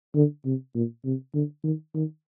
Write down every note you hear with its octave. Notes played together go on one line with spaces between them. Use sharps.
D3
C3
A#2
C3
D3
D#3
D#3